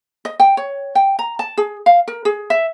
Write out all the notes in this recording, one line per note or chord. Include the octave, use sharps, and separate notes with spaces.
D#5
G5
C#5
G5
A#5
A5
G#4
F5
A#4
G#4
E5